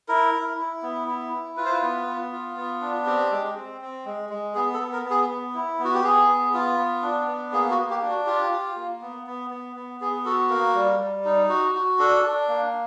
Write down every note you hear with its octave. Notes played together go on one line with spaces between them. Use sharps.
E4 A#4
E4
E4
B3
E4
E4
F4 B4
C5
B4
B3
B3
F4
B3
D4
C4 G4
G#3
C4
C4
G#3
G#3
B3 G#4
A4
B3
A#4
B3
G#4
B3
E4
B3
F#4
G4
B3 G#4
B3
F4
B3
D4
B3
A#3 G#4
F#4
A#3
G4
D4
F#4
F4 G4
F4
A#3
B3
B3
B3
B3
B3 G#4
F#4 A4
A#3 A#4
G3
G3
D#4
F#4
F#4
D4 A4
D4
A#3